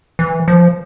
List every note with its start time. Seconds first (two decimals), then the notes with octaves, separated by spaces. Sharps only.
0.19 E3
0.48 F3